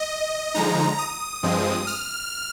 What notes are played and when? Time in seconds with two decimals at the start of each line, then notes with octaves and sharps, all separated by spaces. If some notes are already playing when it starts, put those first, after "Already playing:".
Already playing: D#5
0.54 D3 F3 G#3 D#4 A#5
0.98 D#6
1.43 G2 F3 G#3 C4
1.87 F6